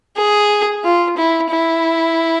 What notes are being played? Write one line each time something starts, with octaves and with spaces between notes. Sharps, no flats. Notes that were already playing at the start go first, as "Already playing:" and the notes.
G#4
F4
E4
E4